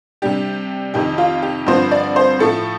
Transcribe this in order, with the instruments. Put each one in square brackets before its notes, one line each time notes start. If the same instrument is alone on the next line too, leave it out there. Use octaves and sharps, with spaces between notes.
[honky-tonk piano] C3 G3 D4 G4
F2 C3 D#3 G4
F4
G4
G2 D3 F3 C4 C5
D5
C5
A2 F3 A3 A4